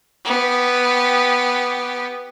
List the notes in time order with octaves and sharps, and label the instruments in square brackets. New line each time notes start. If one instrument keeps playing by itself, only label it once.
[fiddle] B3 G4